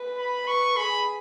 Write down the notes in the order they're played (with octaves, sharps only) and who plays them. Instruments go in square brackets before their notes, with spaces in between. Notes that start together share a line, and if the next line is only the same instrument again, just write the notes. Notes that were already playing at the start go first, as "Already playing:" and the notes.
Already playing: [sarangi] B4
[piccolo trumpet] B5
[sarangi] B4 [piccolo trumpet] C#6
[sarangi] G#4 [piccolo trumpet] B5